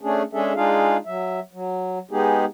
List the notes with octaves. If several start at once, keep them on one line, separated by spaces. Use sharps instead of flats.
A3 C#4 D4 G#4
G#3 C#4 D4 G#4 A4 E5
G#3 D4 D#4 F4 G#4 F5
F#3 E5
F#3
G#3 B3 D#4 G4 G#4